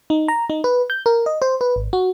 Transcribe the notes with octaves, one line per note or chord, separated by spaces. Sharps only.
D#4
A#5
D#4
B4
G6
A#4
D#5
C5
B4
G#1
F#4